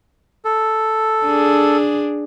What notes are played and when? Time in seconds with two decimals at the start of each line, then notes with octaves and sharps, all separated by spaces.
0.45 A4
1.24 D4 G#4